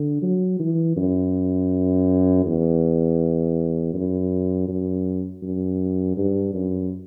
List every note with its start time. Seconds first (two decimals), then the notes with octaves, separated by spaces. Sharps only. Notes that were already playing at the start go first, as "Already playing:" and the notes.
Already playing: D3
0.22 F#3
0.59 E3
0.97 F#2
2.46 E2
3.94 F#2
4.69 F#2
5.43 F#2
6.17 G2
6.54 F#2